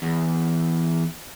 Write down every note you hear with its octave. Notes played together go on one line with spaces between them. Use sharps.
E2